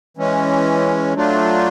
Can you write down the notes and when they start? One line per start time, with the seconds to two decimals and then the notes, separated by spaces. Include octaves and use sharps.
0.17 E3 G#3 C#4
1.13 F#3 A3 D4 F4